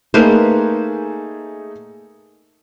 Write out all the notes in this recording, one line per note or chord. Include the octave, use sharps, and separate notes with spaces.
A3 A#3 D#4 G#4 B4 C5